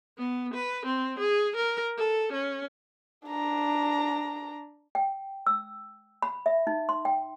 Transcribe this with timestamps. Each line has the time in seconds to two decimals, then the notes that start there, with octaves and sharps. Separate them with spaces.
0.18 B3
0.54 B4
0.86 C4
1.19 G#4
1.56 A#4
1.98 A4
2.33 C#4
3.27 D4 A#5
4.95 G5
5.47 E6
6.22 B5
6.46 E5
6.67 D#4
6.89 C6
7.05 G5